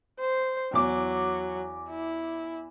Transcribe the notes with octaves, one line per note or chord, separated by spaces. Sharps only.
C5
E2 F#3 D6
E4